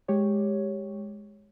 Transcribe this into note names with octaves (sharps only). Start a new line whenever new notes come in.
G#3 G4 C#5